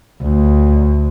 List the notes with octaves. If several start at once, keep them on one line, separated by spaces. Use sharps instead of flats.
D2